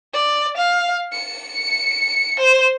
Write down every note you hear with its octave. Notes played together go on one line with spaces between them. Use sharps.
D5
F5
C#7
C5